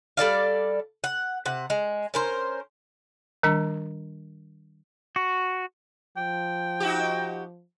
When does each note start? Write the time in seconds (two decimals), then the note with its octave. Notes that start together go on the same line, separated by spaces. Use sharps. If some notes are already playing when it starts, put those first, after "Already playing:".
0.17 G3 A4 D5 F5
1.04 F#5
1.46 C3 F#5
1.70 G#3
2.14 C#4 A#4 C5
3.43 D#3 G3 D4
5.16 F#4
6.17 F3 G5
6.80 D#4 F#4 G4